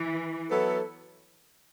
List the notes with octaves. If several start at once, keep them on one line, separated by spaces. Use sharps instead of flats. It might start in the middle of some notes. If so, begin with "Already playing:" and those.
Already playing: E3
F#3 B3 E4 A4